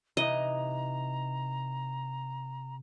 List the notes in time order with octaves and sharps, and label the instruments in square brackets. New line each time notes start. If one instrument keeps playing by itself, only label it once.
[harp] C3 [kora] E3 D#4 [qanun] D#5 [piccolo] A#5